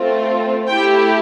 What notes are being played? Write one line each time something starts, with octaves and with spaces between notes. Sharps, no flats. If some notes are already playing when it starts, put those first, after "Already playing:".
Already playing: A3 C4 F4
A3 E4 G4 G5